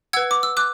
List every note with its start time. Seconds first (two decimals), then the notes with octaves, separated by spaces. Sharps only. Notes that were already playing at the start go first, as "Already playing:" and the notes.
0.13 B4 F#5 E6 G#6
0.31 D6
0.43 E6
0.57 D6 F#6